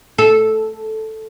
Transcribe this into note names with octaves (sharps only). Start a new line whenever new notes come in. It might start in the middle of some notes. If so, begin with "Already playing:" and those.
A4